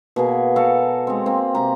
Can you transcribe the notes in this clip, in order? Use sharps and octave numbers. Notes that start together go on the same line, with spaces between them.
B2 A#3 G#4
F#4 A4 C#5 F5
G#3 C4
A#3 C4
C3 G4 A#5